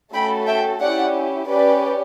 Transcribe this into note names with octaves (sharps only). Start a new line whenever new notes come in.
A3 C#4 F#4 A4 G5 B5
E5 G5
C#4 E4 G4 D5 F#5
C#4 G4 B4 D5